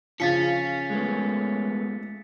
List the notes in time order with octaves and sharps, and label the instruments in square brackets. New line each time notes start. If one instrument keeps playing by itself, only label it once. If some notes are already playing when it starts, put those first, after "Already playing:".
[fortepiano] C#3 F3 [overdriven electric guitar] C#4 [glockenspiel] A6 B6 C#7
[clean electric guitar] G#3 A3 B3